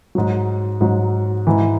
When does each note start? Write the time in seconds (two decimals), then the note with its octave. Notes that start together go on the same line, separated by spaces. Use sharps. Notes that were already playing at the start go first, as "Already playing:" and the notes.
0.15 G#2 F#3
0.81 G#2 F#3
1.47 G#2 E3